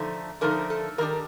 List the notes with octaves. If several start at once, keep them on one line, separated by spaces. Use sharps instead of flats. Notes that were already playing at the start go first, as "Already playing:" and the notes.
Already playing: D3 F3 A3 D#4
D3 F3 A3 D#4 A#4
A4
D#3 G3 D4 A#4